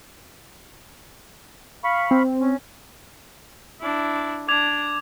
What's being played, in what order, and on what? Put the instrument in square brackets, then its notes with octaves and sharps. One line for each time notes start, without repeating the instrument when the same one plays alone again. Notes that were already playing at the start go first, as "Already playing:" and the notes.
[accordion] F5 B5 C#6
[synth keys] C4
[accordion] C#4
[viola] D4 E4
[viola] D4 [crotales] D6 G#6 F7